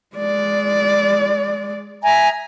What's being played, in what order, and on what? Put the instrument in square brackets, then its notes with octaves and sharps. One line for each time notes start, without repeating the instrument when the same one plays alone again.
[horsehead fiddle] G#3 D5
[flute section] E5 G#5 A#5